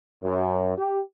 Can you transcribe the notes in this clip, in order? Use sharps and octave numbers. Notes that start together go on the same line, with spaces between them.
F#2
G4